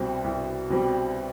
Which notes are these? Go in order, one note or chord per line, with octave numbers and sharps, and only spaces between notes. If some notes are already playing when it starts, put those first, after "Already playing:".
Already playing: C2 B2 G3 C4
C2
B2 G3 C4